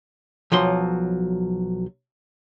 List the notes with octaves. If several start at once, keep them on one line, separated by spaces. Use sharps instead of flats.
B1 F3 F#3 C6